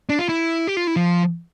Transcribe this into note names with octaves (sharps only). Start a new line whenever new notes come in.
D4
F4
E4
G4
F4
E4
F3